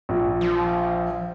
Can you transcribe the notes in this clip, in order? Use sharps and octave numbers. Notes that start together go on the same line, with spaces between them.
A#1
F3